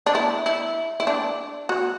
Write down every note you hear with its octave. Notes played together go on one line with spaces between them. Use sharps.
D4
E4
E4
E4
D4
F#4